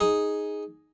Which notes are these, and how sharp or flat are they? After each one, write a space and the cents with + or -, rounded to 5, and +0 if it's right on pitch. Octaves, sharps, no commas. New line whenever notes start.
D#4 +0 G#4 +0